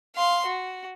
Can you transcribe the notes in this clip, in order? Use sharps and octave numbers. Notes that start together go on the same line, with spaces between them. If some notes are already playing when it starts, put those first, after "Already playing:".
F5 C6
F#4